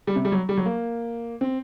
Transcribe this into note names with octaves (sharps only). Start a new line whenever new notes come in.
G3
C3
G3
F#3
G3
F#3
A#3
C4